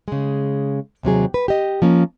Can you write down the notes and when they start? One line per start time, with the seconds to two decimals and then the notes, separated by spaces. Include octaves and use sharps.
0.08 C#3 G#3
1.03 D#2 C3 F#3 G#4
1.34 B4
1.48 G4 D#5
1.82 F3 A#3 C#4